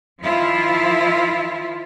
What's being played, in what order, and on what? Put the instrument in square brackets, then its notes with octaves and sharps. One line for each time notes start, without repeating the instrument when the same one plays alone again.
[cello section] D#3 F3 E4 F4